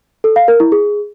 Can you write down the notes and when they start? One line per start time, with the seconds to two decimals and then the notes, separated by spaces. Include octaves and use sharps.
0.24 A4
0.36 F5
0.48 A#4
0.60 E4
0.72 G#4